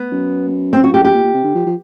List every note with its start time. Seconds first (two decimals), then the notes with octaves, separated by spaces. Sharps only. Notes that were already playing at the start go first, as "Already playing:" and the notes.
Already playing: B3
0.12 F#2
0.73 C4
0.84 F#4
0.94 G4
1.04 G4
1.14 A#2
1.24 A#2
1.34 C3
1.44 D3
1.54 F3
1.66 F3